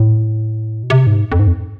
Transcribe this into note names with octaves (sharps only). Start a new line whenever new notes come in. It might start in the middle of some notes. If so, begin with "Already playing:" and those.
Already playing: A2
B2
C3
G#2
F2
G#2
F2